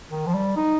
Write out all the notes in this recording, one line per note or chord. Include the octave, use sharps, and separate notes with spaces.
D#3
F3
G3
D#4